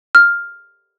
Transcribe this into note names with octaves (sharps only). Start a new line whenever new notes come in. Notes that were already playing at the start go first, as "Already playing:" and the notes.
F6